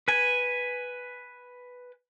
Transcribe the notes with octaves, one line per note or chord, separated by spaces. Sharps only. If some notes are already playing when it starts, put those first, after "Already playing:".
B4 G#5